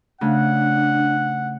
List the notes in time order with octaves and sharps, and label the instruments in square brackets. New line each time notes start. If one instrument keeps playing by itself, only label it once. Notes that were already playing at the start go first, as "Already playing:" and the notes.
[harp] C#3 A3 F#6 [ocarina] D4 [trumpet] F#5